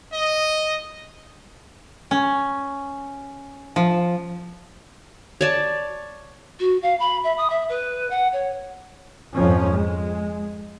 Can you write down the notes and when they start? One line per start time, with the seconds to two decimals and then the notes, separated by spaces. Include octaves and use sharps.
0.13 D#5
2.11 C#4
3.76 F3
5.41 C#5 D5 A5
6.60 F#4
6.82 F5
6.99 B5
7.24 E5
7.37 D#6
7.50 E5
7.69 B4
8.10 F#5
8.33 C#5
9.35 F2 G#2 F3 C#4
9.73 G#3